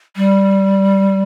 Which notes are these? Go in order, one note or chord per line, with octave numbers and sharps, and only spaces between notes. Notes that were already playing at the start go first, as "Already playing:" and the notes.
G3